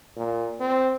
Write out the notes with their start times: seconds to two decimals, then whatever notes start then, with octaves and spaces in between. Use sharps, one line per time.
0.17 A#2
0.60 C4